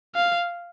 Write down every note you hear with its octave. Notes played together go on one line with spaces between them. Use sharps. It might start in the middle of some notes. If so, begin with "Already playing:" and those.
F5